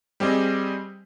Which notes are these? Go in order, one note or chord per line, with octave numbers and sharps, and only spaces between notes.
G3 C4 G4 G#4 D#5